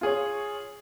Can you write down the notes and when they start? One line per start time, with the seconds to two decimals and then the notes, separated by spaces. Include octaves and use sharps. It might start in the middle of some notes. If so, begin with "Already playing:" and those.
0.01 F4 G#4 C#5